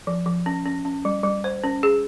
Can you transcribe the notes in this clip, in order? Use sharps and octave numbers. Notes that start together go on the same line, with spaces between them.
F3
F3
C#4
C#4
C#4
G3
G3
C5
C#4
G#4